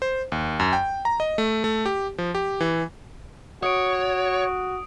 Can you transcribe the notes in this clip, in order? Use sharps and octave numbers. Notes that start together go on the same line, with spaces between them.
C5
D#2
F#2
G5
A#5
D#5
A3
A3
G4
F3
G4
E3
F#4 C#5 D#6 D7